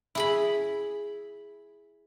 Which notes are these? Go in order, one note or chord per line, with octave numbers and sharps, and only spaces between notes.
E4 G#4 B5